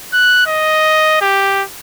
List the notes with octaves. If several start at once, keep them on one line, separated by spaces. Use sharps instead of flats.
F#6
D#5
G4